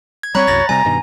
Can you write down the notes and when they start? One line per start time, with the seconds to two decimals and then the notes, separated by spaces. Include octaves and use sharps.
0.23 G#6
0.35 G3 C4 C#5 A#5 B5 F#6
0.48 C2 F#2 A6 A#6
0.69 C3 G3 G#5 A#5
0.85 G2 B2 D#3